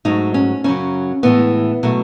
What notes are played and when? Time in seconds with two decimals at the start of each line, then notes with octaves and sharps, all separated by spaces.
0.05 G#2 F#3 A3 D#4
0.34 C#4
0.64 F#2 C#3 F#3 C#4
1.23 A2 E3 G#3 B3
1.83 B2 F#3 A3